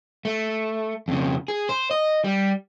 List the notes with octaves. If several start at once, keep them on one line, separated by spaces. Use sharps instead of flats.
A3
F2 C#3
G#4
C5
D#5
G3